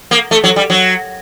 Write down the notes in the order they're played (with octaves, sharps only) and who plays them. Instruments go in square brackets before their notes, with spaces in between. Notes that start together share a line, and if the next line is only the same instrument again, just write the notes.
[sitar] A#3
A3
F#3
G3
F#3